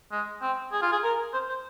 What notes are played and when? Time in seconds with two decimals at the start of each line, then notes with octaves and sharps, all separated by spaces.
0.12 G#3
0.42 C4
0.72 G#4
0.82 F4
0.92 G#4
1.03 A#4
1.33 C5
1.49 C5